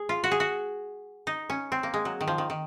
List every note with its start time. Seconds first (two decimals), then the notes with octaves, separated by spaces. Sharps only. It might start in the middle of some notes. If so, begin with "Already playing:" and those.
Already playing: G#4
0.09 F4
0.24 F#4
0.31 G#4
0.40 F#4
1.27 D#4
1.50 C#4
1.72 C4
1.83 A#3
1.94 G#3
2.05 F#3
2.21 D#3
2.28 F3
2.38 D#3
2.50 D#3